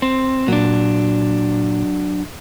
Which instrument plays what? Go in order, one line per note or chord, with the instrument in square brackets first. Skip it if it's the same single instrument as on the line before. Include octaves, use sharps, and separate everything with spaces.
[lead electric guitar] C4
[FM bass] A#2 [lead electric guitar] F#3 D4